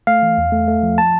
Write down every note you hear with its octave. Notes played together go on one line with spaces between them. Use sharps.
A3 F5
E3
E2
A3
A3
F3
A5